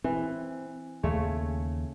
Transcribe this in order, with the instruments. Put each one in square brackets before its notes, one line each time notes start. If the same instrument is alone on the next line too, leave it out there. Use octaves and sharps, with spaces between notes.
[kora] E3 [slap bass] C4
[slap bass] D#2 [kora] C#3 A3 C#5